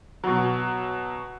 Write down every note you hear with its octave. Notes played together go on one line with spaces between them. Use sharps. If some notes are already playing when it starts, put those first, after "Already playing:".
B2 F#3